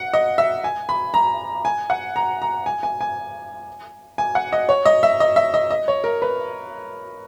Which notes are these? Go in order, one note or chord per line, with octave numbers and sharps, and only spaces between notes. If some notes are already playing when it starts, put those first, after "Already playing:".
Already playing: F#5
D#5
E5
G#5
B5
A#5
G#5
F#5
A#5
A#5
G#5
G#5
G#5
G#5
F#5
D#5
C#5
D#5
E5
D#5
E5
D#5
D#5
C#5
A#4
B4